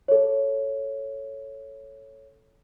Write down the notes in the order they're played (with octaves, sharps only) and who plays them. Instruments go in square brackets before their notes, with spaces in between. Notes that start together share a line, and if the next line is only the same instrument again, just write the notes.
[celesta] A4 C#5